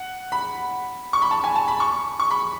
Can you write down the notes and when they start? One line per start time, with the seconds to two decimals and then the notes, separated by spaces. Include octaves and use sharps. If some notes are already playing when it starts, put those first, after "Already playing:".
Already playing: F#5
0.32 B5
1.13 C#6
1.22 B5
1.31 A5
1.44 G#5
1.56 A5
1.68 B5
1.80 C#6
2.20 C#6
2.31 B5